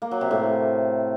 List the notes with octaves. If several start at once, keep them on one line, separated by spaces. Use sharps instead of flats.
A#3
F#3
C3
A2